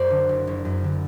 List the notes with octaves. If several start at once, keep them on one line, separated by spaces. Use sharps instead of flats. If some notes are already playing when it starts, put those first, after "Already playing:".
Already playing: F#2 A#4 C5 D5
D3
F#1
F#1
F#2
D3